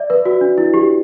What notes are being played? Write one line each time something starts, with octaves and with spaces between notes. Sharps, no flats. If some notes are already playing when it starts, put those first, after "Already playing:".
Already playing: D5 E5
B4
F#4
D4
E4
G4